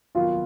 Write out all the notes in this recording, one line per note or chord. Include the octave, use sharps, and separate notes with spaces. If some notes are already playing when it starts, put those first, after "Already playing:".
F1 D#2 D#3 F#3 B3 F4